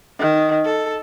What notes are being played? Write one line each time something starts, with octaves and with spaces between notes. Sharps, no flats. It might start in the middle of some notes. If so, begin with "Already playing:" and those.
D#3
A4